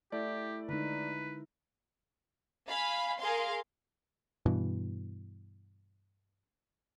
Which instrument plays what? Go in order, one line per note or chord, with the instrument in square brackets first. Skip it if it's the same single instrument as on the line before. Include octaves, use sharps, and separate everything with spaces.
[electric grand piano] A3 D5 [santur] E4 [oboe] G4
[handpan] D3 G#3 D#4 [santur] A#4 [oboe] B4
[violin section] F5 G#5 B5
G#4 A#4 F5 C6
[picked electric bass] G2 B2 E3